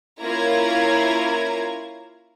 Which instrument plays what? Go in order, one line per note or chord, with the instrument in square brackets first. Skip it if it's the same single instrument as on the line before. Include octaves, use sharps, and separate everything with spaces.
[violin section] A#3 C#4 E4 F4 A#5 G#6